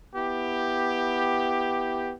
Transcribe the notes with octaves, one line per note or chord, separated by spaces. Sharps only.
B3 E4 G4